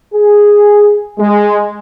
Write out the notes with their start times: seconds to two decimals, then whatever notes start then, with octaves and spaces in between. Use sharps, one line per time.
0.13 G#4
1.19 G#3